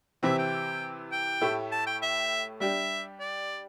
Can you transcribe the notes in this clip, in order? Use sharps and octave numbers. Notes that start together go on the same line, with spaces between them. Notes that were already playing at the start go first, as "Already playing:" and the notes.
C3 E3 C4 E4 E5
G5
G5
A2 A3 E4 G4
A5
G5
E5
G3 D4 G4 E5
D5